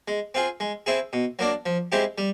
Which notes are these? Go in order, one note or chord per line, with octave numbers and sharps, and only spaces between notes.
G#3
C4 F4 G#4
G#3
C4 E4 G#4
B2
F#3 A#3 D4
F3
G#3 C4 E4 G4
G3